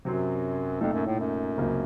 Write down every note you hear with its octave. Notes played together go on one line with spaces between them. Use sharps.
F#2 C3 F#3 C4
F2 A#2 A3 D#4 A4
F#2
A2
F#2
C#2 C3 F#3 A#3